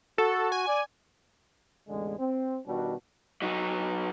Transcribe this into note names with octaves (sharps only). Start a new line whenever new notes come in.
F#4 A4
G#5
D5
A1 E2 D3 G#3
C4
B2 D#3 G3 D4 F#4
F#3 D#4